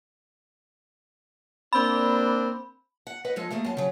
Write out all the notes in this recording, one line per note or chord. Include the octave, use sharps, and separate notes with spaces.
A#3 C4 D4 B5
F#5
B4 D#5 F#5
F3 G#3 A4 D#5
D#2 A3 A#3 G#4
F#2 A5
C#3 F#3